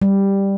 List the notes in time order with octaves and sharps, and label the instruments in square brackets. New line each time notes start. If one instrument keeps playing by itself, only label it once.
[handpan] G3